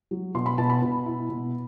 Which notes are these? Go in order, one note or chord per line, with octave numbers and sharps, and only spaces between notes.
F#3
B2 C6
B5
B2 A5
B5
B2
E4
B2